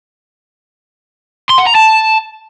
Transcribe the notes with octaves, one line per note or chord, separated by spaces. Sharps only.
C6
F#5
A#5
A5